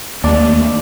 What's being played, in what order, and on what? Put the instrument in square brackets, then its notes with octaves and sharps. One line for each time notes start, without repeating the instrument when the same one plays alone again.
[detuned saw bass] D#2 [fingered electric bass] A3 A#3 [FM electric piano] D4 D5